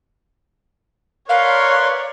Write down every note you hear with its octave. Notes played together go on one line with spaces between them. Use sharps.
A#4 B4 C#5 D5 F5 C6